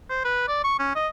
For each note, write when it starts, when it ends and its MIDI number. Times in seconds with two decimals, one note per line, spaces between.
0.10 0.23 72
0.25 0.45 71
0.48 0.63 74
0.64 0.75 85
0.79 0.95 61
0.95 1.08 75